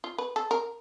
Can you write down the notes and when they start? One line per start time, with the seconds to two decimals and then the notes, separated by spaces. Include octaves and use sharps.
0.04 F4
0.18 B4
0.36 A4
0.51 A#4